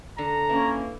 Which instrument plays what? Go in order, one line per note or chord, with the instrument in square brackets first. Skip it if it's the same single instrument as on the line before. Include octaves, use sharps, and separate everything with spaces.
[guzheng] D3 [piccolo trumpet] A#5
[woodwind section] E3 A#3 [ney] C#4 [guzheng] E4